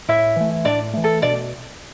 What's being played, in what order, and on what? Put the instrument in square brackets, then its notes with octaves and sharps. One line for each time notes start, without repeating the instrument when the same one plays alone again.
[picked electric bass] A2 [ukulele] E4 E5
[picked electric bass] E3 A3
[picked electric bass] A2 [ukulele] D4 D5
[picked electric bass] E3 A3
[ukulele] A4
[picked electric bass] B2 [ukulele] D4 D5